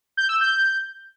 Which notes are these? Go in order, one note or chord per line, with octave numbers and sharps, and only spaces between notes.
G6
E6
G6